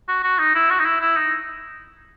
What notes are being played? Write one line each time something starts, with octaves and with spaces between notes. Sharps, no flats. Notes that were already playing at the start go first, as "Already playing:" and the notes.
F#4
F#4
D#4
E4
F#4
D#4
E4
E4
D#4